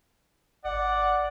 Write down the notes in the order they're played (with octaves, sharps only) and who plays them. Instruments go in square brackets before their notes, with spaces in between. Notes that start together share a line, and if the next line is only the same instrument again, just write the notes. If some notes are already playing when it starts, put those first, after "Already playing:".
[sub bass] G#1 [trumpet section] D5 [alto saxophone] F#5